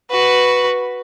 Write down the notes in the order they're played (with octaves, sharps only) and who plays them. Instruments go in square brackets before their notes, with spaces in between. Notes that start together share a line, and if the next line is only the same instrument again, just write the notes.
[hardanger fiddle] F#4 B4